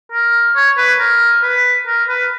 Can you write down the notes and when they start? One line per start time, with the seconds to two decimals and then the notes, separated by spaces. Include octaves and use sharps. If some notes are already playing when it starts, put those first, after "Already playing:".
0.12 A#4
0.56 C#5
0.78 B4
0.99 A#4
1.43 B4
1.87 A#4
2.09 B4